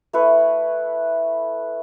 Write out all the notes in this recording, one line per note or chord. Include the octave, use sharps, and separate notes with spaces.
A3 E4 B4 C#6